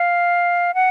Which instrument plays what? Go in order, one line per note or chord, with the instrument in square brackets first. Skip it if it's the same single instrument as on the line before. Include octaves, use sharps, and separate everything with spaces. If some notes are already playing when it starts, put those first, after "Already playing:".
Already playing: [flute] F5
F#5